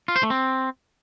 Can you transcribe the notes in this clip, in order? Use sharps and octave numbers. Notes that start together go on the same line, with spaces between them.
F4
C5
A3
C4